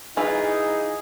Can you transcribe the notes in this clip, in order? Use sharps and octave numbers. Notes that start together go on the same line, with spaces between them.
E3 D#4 F4 G#4